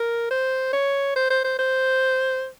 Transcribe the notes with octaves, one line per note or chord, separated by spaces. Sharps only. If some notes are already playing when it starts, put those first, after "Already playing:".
Already playing: A#4
C5
C#5
C5
C5
C5
C5